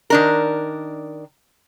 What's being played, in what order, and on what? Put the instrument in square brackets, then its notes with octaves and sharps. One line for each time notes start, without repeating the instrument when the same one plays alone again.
[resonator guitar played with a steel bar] D#3 D4 A#4